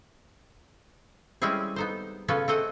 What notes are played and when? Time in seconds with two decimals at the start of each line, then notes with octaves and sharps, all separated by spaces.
1.42 G3 G#3 C4 C#4 E4 G#4
1.76 B3 D#4 C5
2.28 C#3 B3 C#4 F4 A4 B4
2.48 A3 C4 D#5 F#5